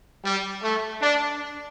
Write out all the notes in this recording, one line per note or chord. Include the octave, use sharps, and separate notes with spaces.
G3
A3
D4